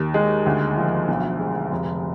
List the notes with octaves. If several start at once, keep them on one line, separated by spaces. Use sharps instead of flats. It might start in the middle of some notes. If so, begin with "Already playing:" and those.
Already playing: D#2
G#3
D2
F3
B1
G#3
F1